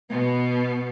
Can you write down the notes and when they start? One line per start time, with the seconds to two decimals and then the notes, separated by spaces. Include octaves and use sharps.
0.10 B2 B3